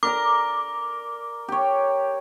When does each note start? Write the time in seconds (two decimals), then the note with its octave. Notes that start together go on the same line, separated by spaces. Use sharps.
0.03 A#4 D5 A#5 D6
1.48 G4 C#5